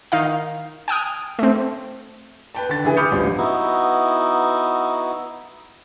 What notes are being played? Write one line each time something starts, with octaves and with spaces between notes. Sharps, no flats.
D#3 D#4 F5
G5 G#5 D#6 F6
A3 C4
B4 G5 A5
D3 A6
C#3 E3 E4 G#4
B5 D6 D#6 F6 G6 C#7
A1 D2 F3 G3 B3
B3 D#4 E4 F#4